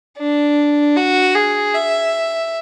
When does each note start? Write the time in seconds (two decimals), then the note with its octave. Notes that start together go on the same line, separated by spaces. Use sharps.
0.18 D4
0.97 F#4
1.35 G#4
1.75 E5